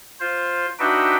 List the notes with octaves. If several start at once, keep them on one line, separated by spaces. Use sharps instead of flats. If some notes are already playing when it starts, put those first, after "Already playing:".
F4 C5
D4 D#4 F#4 B4 E5 G5